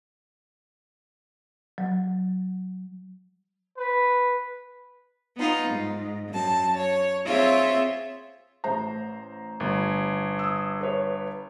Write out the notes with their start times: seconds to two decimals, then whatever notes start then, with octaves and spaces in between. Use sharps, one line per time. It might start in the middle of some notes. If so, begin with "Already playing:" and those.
1.78 F#3
3.78 B4
5.37 B3 D#4 F4
5.68 G#2
6.30 F#2 A5
6.77 C#5
7.26 C4 F4 G#4 C#5 E5
8.64 A1 C5 A#5
9.60 G1
10.39 D#6 E6
10.81 B4 C#5